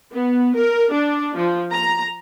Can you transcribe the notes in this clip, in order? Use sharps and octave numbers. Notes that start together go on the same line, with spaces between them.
B3
A#4
D4
F3
A#5